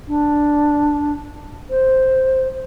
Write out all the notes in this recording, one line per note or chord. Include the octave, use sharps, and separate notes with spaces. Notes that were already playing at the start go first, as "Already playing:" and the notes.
D4
C5